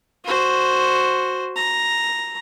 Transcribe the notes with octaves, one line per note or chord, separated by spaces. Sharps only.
F#4 C5
A#5